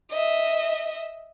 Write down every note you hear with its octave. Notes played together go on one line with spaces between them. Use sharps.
D#5 E5